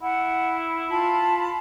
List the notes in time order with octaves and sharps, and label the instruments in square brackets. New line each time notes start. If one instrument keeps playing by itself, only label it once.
[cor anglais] E4 [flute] F#5
[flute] F4 [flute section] A5 B5